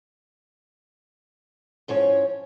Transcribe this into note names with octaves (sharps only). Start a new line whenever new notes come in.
G#2 F3 C#4 C#5